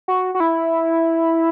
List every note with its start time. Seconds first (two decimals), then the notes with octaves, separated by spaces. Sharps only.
0.08 F#4
0.35 F#4
0.40 E4